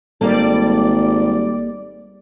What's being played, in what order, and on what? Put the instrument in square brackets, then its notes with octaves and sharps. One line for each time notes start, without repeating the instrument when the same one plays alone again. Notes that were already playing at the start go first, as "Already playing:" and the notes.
[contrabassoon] G#1 [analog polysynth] G3 D5 [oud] A#3 A4